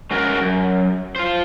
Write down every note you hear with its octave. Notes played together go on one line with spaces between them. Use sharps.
G#3 C#4 F#4 A#4
F#2
F4 C5